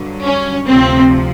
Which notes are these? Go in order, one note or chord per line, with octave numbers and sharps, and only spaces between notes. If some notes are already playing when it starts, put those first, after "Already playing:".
Already playing: G2 D3 F#3
C#4
D2 C3 F3 C4